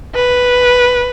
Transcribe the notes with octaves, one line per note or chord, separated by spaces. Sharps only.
B4